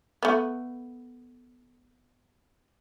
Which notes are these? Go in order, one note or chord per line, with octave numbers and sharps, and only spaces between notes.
A3 B3